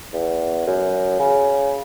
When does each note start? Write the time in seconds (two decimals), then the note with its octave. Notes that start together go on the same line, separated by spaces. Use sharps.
0.13 E2
0.67 F#2
1.20 C#3